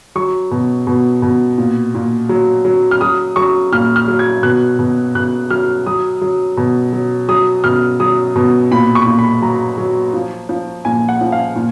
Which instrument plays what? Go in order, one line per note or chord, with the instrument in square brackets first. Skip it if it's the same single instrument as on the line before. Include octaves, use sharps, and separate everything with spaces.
[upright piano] F#3 C#6
B2
B2
B2
A#2
A#2
F#3
F#3
F6
F#3 D#6
F#3 C#6
A#2 F6
F6
F#3
G#6
B2 F#6
B2
B2 F#6
F#3 F6
F#3 D#6
F#3
B2
F#3
F#3 D#6
B2 F6
F#3 D#6
B2
A#2 B5
C#6
A#2
B5
F#3 A#5
F#3
F3
F3
A#2 G#5
F#5
F3
F5
A#2